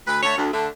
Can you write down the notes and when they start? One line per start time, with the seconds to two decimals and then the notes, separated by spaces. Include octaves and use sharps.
0.07 D2 B4
0.23 D3 A3 C#5
0.38 D2
0.52 D3 A3